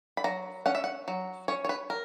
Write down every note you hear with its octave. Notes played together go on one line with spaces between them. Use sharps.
B5
F#3 A#5
C#4 F#5
E5
F#5
F#3
C#4 C#5
C#5
B4
A#4